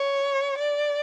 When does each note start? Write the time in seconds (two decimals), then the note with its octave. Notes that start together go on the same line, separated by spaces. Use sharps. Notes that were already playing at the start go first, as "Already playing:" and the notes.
Already playing: C#5
0.58 D5